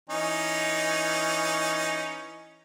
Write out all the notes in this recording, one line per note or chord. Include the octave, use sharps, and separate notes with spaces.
E3 C#4 D#4